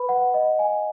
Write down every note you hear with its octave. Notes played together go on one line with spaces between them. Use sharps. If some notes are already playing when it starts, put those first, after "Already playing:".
Already playing: B4 B5
F#5
D#5
G#5